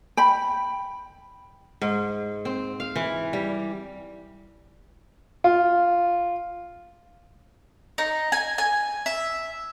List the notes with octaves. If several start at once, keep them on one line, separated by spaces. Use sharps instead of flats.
G5 B5
G#2
C4
F5
E3
G3
F4
D#4
G#5
G#5
E5